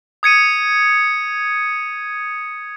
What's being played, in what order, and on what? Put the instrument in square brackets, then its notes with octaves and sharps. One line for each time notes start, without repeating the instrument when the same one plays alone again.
[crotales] D#6 G#6 C#7 D#7